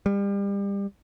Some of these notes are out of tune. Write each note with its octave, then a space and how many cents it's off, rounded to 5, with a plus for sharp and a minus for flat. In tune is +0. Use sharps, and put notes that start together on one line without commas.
G3 +30